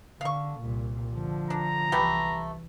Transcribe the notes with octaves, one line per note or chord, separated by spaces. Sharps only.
D3 F5 C#6
C2 A#2
D3 F3
D4 A#5
C2 E3 A3 B3 G4